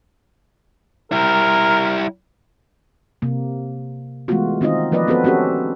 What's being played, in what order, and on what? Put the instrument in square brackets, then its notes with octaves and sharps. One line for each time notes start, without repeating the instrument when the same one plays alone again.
[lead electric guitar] G3 E4 [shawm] A#4
[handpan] C3 A#3
E3 G#3 A3 B3 F4 F#4
D#3 C4 D#4 F4 D#5
F3 A#3 B4 D5 D#5
B3 C4 F#4 A4 B4
C4 C#4 F#4 G4 A4